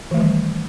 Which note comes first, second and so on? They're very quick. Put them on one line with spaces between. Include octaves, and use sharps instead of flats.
E3 A3 D#3 G3